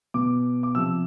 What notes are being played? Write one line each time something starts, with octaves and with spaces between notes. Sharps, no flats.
B2 D6
D6
C3 F3 E6